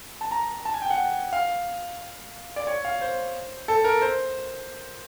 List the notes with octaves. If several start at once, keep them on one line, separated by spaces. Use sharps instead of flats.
A5
A#5
A5
G#5
G5
F#5
F5
D5
C#5
F5
C5
A4
A#4
C5